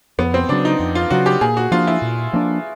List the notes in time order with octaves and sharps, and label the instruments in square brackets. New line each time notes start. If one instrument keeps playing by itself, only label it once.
[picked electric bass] F2 [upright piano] B3
[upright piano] C4
[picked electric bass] C#3 F#3 [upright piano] D4
[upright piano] D#4
[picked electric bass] F2
[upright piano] F4
[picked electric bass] C#3 F#3 [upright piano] F#4
[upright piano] G4
[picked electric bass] A#2 [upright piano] G#4
[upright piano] F#4
[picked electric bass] F3 A#3 D4 [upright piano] F4
[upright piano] E4
[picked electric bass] A#2
F3 A#3 D4